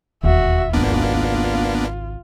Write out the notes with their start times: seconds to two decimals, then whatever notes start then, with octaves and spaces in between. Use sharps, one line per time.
0.23 E1 D#2 F#4 E5
0.73 G#1 C#2 A#3 B3 D4 F4